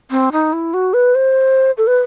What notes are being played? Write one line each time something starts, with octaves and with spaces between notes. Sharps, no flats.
C4
D#4
E4
F#4
B4
C5
A4
B4